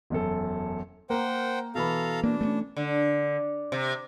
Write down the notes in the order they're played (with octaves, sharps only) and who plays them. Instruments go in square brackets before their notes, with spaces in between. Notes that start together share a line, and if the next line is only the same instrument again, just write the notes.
[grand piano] E1 F#2 A4
[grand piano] A#3 A#4 [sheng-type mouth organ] C5 F#5 G5
[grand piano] B2 E3 B5 [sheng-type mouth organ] A4 F5 A#5
[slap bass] A#3 [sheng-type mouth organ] D4
[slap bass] A3 B3 C#4
[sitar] D3
C3